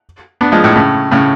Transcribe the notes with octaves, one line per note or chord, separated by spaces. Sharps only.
B3 D4
F3 G#3
A2
A2 C#3
A2 C#3